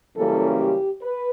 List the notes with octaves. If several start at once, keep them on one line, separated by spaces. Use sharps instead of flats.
F#2 C#3 E3 G3 A#3 A4
G4
B4